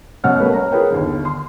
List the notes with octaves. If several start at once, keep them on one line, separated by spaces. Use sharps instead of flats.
F#2 B2 C#5 F#5 F6
G3 A3 A#3 C#4 B4
C#5 F#5 A#5
F4 G#4 A#4 B4 C#5 G5
G1 D#2
C6